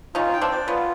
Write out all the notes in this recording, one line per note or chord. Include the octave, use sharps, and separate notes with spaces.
C#4 D#4 F4
G5
C4 D4
D5
B3 C#4 F4